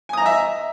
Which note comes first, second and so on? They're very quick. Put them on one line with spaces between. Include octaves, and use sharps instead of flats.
G#5 D#6 A#5 D#5 E5